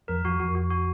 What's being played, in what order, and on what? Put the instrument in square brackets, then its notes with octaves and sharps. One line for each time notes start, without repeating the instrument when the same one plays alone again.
[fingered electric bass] F2 [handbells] A#4
[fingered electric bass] F2 [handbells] F#4
[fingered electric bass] F2 [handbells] F#4
[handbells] F#4
F#4